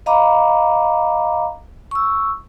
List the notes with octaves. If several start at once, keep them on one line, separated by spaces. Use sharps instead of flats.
D#5 F5 A#5 B5 D6
C#6 E6